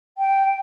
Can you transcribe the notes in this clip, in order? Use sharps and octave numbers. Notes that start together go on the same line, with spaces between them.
G5